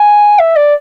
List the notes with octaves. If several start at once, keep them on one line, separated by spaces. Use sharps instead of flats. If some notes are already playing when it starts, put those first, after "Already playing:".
Already playing: G#5
E5
D5